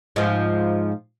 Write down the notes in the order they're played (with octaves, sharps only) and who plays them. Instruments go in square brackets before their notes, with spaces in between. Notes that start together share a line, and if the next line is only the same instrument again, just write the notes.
[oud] G#2 F3